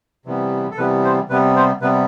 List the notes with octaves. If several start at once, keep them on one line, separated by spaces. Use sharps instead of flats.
C3 E3 G3 B3
A4
C3 E3 G3 B3 B4
C5
C3 G3 B3 B4
C5
C3 G3 B3 B4